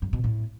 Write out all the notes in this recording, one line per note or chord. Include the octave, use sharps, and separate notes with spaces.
G2
B2
A2